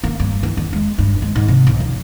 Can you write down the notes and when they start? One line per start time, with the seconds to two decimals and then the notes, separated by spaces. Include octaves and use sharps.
0.04 A#3
0.20 G2
0.43 E3
0.57 E2
0.73 G#3
0.98 G2
1.22 G#3
1.36 G#2
1.48 C3
1.67 B1
1.80 F2